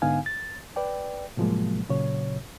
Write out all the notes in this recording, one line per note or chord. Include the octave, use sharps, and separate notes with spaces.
G#2 D3 B3 D#4 F5 G#5
A6
B4 D5 G5
A2 C3 F3 F#3 G#3 A#3
A#2 C#3 F#3 C#5